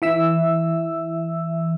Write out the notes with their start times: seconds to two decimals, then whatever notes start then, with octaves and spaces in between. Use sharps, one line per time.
0.02 E3 E5 E6